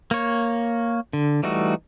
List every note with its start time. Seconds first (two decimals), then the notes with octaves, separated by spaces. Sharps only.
0.11 A#3 C#5
1.13 D3
1.43 E3 G3 A3 D#4 F#4